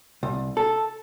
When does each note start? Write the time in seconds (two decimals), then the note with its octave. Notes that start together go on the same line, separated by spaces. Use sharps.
0.23 C2
0.57 A4